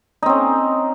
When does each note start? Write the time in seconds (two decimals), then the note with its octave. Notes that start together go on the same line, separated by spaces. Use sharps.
0.22 D#4
0.26 C4
0.29 C#4